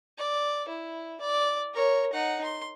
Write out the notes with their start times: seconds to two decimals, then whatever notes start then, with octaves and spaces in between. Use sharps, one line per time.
0.18 D5
0.68 E4
1.21 D5
1.73 A#4 C#5
2.13 D#4 F#5
2.44 C6